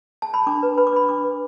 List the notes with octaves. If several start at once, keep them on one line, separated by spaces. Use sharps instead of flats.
A5
B5
D4 D6
B4
B4 B5
D6
D4 B5
D4 D6
B4